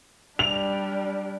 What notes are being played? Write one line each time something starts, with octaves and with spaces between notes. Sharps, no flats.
G3 D4 F7